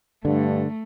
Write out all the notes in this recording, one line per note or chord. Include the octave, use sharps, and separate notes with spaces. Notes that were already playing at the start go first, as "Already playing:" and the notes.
G2 D3 A3